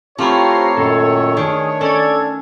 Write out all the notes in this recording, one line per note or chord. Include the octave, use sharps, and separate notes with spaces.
A3 C4 E4 F4 G4 C#5 A#5 C7
F#2 A#2 D#3 A4
D#3 D4 G#4
C#4 A4 D5 G#6